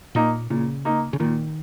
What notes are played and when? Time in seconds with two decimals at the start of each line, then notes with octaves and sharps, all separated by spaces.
0.15 A#2 A#3 D#4
0.50 A#2 C#3
0.85 A#3 D#4
1.13 C#3
1.20 A#2 D#3